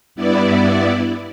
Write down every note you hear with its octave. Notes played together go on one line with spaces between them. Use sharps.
G2 B3 E4 D5